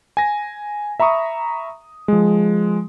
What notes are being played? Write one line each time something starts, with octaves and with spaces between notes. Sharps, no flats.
G#5 A#6
E5 A#5 B5 C#6 D#6
F3 G#3